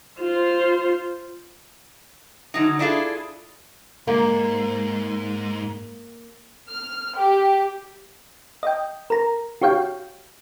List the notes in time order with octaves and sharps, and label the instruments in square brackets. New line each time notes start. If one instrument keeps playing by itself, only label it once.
[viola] F4 C5
[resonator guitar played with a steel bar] D3 F#3 D#4
D4 E4 F4 G#4 A4
[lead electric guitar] G#2 [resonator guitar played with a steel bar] A#3
[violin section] F6
G4
[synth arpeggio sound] D#5 G5
A#4 A#5
F#4 G4 C#5 F5 G5